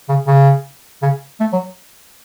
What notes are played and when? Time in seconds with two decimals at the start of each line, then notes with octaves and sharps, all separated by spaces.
0.09 C#3
0.27 C#3
1.02 C#3
1.40 A3
1.53 F#3